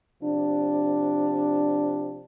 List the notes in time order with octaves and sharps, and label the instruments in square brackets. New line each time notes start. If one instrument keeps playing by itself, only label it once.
[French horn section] C3 F3 D4